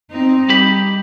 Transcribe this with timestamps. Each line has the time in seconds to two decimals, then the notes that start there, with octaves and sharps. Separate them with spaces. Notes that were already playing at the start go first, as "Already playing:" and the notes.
0.11 C4 D#4
0.50 G3 G4 B5